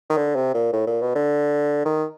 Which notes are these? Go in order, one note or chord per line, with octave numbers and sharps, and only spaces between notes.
D#3
D3
C3
A#2
A2
A#2
B2
D3
D#3